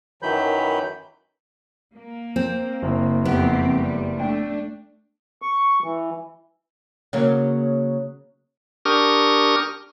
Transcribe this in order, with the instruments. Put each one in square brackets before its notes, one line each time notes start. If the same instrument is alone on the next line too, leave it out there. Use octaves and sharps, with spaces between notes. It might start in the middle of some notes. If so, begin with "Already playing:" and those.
[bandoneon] F#2 D#3 E3 F#3 B5 G6
[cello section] A#3
[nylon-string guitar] C4
[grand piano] F#1
[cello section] F2 C4 G4 [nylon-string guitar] B3
[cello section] G3
[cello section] A3 D4 [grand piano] G5
[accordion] C#6
E3
[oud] C#3 F#3 A#3
[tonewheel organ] D4 G4 A#4 C#6 D#6 F6